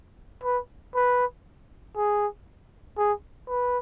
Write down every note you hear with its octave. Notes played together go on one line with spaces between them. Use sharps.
B4
B4
G#4
G#4
B4